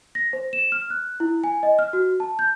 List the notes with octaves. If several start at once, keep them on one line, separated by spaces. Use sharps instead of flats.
A#6
C5
E7
F6
F#6
E4
G#5
D#5
F6
F#4
A5
G6